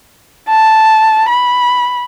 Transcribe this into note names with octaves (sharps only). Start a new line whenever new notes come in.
A5
B5